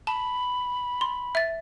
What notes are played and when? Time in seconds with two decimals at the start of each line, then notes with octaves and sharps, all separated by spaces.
0.07 A5 B5
1.01 C6
1.35 E5 A6